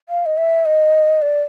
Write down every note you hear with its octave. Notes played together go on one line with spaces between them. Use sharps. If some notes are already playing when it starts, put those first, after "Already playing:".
F5
D#5
E5
D#5
D5